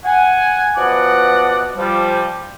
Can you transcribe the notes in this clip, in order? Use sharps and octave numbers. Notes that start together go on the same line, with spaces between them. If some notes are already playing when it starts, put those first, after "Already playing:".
F#5 G#5
E2 B2 F3 D5 D#5 F#5
F3 G3